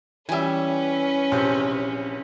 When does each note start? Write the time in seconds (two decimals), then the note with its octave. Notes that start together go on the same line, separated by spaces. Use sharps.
0.29 E3 G3 C#4 B4 E5 G#5
1.31 A#1 C3